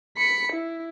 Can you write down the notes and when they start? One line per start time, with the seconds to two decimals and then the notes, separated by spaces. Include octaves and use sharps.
0.17 B5 C#7
0.52 E4